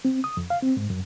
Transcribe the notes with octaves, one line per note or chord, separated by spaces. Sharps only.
C4
D#6
F2
F5
C4
G#2
F#2